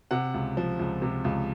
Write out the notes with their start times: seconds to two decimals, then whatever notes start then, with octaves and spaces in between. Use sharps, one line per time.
0.11 C3 F#5
0.34 C#2
0.57 F3
0.79 C#2
1.02 C3
1.25 C#2